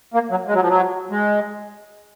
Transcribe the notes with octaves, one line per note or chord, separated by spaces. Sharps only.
A#3
F#3
G#3
F#3
F3
F#3
G#3